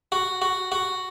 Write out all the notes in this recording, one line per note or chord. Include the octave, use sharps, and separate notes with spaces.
F#4
F#4
F#4